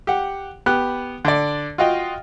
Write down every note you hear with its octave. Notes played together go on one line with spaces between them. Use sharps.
G4 F#5
B3 G4 F#6
D3 D5
F4 F#4 D#5 F5 G5